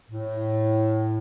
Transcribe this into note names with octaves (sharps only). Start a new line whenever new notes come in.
A2